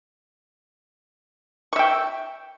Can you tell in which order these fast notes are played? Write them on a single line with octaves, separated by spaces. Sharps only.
C#6 E5 G5